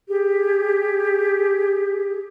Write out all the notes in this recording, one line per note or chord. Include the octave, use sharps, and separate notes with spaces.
G4 G#4